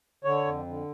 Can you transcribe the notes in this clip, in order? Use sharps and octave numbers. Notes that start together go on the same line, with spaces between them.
D3 C#5
F2
D3